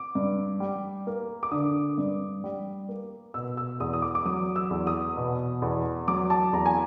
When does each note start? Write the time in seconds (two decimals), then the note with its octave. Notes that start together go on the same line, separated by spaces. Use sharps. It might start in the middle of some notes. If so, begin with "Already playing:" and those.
Already playing: D6
0.15 G2
0.60 G3
1.07 A#3
1.43 D6
1.51 D3 D#6
1.98 G2
2.44 G3
2.89 A#3
3.34 B2 E6
3.57 E6
3.80 E2 D#6
3.93 D#6
4.02 D6
4.15 D6
4.25 F#3 D#6
4.56 E6
4.70 E2
4.87 D#6
5.17 B2
5.62 E2
6.08 F#3 D6
6.30 A5
6.53 E2 A#5
6.66 G#5